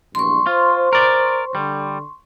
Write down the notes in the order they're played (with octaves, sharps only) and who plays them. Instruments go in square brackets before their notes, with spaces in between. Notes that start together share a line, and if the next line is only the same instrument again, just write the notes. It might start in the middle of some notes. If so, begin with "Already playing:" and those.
[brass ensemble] A#1 E2 G2 [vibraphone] C6 C#6
[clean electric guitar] F4 [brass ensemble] C5
[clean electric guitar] A#4 D5
[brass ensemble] D3 [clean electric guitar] G3